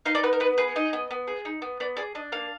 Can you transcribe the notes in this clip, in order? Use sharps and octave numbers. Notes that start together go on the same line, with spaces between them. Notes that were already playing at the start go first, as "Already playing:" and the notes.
D#4 F5
D5
B3 B4
A#4
B3 B4
G#4 B4
D#4 D#5
B3
B3
G#4
D#4
B3
B3 D5
G#4 D5
D4 D#5
A#3 F5